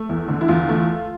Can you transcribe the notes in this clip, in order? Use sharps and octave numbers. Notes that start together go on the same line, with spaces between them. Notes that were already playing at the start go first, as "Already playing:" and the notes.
Already playing: A3
E2
D3
E4
E2 F4
A3